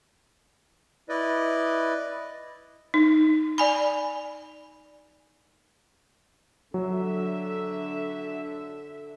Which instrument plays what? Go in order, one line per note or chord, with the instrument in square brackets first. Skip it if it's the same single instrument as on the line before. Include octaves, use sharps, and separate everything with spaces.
[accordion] E4 B4 D5 D#5
[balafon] D#4
D5 G#5 B5
[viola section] D3 E5 [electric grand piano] F#3